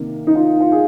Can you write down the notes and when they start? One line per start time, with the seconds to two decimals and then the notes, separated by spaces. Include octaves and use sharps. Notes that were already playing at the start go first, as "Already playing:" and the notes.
Already playing: C3 D#3 A#3
0.27 D#4
0.35 F4
0.60 F4
0.72 G#4